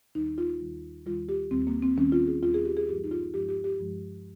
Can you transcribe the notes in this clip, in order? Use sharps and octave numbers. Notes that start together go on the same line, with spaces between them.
D#2 D#3 G3 D#4
F4
D#2 D#3 G3
D#2 D#3 G3 F4
G4
D#2 D#3 G3 C4
A#3
C4
D#2 D#3 G3 C#4
F4
G#4
D#2 D#3 G3 F4
G#4
G4
G#4
G2 F3 G#3 G4
D#4
F4
G2 F3 G#3 G4
G4
G4
G2 F3 G#3